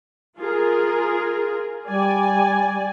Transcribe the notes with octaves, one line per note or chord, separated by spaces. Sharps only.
F4 G#4 A#4
G3 D5 G#5